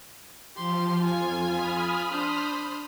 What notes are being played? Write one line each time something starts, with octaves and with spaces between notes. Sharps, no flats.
F3 G4 C6
F2 F4 G#5
B5 D#6 F6
D4 C5